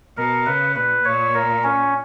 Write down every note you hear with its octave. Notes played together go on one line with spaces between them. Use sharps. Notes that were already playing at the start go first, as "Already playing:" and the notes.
B2 A#4
C#3 B4
A#2 B4
A#2 C#5
A#4
C#4